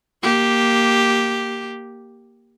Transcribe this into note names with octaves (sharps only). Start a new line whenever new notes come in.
A#3 G4